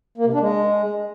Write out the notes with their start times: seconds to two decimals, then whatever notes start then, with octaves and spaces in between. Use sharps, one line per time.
0.18 A#3
0.25 C3
0.33 D4
0.41 G#3